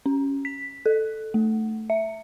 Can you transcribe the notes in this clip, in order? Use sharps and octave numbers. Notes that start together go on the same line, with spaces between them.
C#4
B6
A4
A3
E5